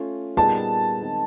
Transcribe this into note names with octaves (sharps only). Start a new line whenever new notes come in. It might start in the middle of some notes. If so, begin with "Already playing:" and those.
Already playing: A3 C#4 F4
A#2 G3 B3 D#4 G#4 A5
D#3 G#3 C4